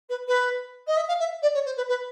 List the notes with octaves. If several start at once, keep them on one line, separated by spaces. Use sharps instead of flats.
B4
B4
D#5
E5
F5
E5
D5
C#5
C5
B4
B4